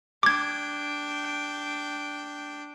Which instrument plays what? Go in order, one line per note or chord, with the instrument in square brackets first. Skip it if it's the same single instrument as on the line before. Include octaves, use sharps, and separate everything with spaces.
[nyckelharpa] D4 G5 [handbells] D6 G#6